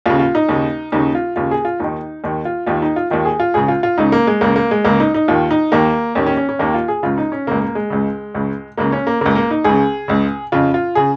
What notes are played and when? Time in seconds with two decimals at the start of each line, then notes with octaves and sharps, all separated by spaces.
0.06 D#2 C#3 F4
0.19 F4
0.35 D#4
0.49 D#2 C#3
0.92 D#2 C#3 D#4
1.15 F4
1.36 D#2 C#3 F4
1.51 G#4
1.65 F4
1.80 D#2 D#3 D#4
2.24 D#2 D#3
2.45 F4
2.66 D#2 D#3 F4
2.82 D#4
2.96 F4
3.10 D#2 D#3 F4
3.25 G#4
3.40 F4
3.54 C#2 C#3 G#4
3.68 F4
3.83 F4
3.98 C#2 C#3 D#4
4.12 A#3
4.27 G#3
4.41 C#2 C#3 A#3
4.56 A#3
4.71 G#3
4.84 C#2 C#3 A#3
5.00 D#4
5.14 D#4
5.28 D#2 D#3 F4
5.51 D#4
5.72 D#2 D#3 A#3
6.15 D#2 D#3 C#4
6.27 C#4
6.37 C#4
6.49 C#4
6.59 D#2 D#3 A#3
6.74 F4
6.88 G#4
7.03 C#2 C#3 F4
7.18 D#4
7.32 C#4
7.47 C#2 C#3 A#3
7.61 A#3
7.75 G#3
7.90 C#2 C#3
8.34 C#2 C#3
8.77 C#2 C#3 A#3
8.92 C#4
9.07 A#3
9.21 C#2 C#3 A#3
9.35 A#3
9.51 D#4
9.64 C#2 C#3 G#4
10.08 C#2 C#3
10.52 F2 C#3 F4
10.74 F4
10.95 C#3 G#4